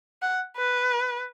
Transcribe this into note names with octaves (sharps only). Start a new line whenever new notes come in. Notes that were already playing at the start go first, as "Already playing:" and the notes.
F#5
B4